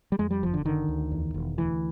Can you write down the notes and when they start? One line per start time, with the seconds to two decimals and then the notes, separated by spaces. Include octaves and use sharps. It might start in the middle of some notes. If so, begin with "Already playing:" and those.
0.12 G3
0.19 F2 G#3
0.31 G3
0.43 F#1 F3
0.54 D3
0.65 D3 D#3
0.89 D2
1.12 E2
1.34 E1
1.58 D2 E3